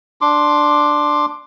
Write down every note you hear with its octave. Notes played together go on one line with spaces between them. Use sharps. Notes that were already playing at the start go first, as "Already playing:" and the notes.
D4 C6 D6